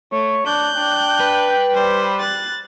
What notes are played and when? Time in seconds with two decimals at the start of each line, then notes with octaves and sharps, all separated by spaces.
0.13 A3 C#5
0.46 D4 F#6 G6
0.76 D4 G5
1.20 B4
1.74 G3 C5
2.20 F#6 A6